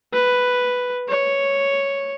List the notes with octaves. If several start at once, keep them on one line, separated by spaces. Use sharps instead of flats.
B4
C#5